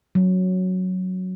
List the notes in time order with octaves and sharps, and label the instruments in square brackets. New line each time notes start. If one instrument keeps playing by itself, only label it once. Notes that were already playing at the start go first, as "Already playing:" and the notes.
[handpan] F#3